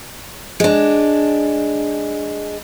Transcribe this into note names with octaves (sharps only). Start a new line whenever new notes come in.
G#3 D4